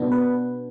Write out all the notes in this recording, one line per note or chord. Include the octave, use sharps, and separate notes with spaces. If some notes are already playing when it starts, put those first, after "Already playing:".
Already playing: B2 B3 D4
B4